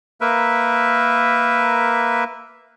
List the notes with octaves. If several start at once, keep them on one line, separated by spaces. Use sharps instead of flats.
A#3 A#4 B4 E5